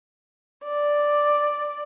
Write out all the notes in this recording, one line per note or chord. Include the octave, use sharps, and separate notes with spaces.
D5